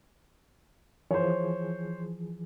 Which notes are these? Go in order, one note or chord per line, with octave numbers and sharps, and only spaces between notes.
E3 F3 G#4 C5 C#5